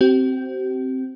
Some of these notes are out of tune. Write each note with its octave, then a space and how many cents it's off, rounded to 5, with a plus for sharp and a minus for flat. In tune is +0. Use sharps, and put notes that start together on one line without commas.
C4 +0 G4 -45